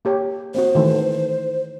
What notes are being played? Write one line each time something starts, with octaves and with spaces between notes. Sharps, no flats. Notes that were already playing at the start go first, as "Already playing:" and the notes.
A#3 G4 C#5
A#3 C4 F#4 C5
D#3 E3 A3